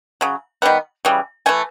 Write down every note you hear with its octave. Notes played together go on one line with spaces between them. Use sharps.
C#3 F#3
D#3 G3 B3
C#3 E3 G3
E3 A3 G#5